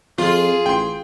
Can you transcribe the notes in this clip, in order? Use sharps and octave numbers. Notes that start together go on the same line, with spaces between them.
F2 F4 G#4
A1 G5 C6